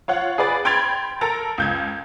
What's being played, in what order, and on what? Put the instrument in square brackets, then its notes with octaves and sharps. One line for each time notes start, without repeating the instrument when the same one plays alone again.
[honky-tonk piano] F4 C#5 F#5
G#4 B4 D5 B5
G5 B5 C6 G#6 A6 F7
A4 A#4 A#5 A6
C#2 G6 G#6